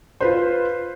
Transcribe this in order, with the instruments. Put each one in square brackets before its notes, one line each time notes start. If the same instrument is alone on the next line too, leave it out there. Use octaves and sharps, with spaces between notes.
[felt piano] F4 B4 C5